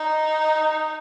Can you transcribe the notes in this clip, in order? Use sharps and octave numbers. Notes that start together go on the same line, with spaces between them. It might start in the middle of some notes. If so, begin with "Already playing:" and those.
Already playing: D#4